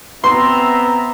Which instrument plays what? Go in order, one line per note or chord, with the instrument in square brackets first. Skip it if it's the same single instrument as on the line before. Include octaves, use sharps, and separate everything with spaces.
[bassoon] B3 [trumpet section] C4 E5 A#5 [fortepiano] C6